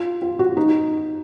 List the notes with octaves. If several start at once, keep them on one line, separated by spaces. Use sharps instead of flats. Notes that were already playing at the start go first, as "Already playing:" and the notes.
Already playing: F4
F4
F#4
D#4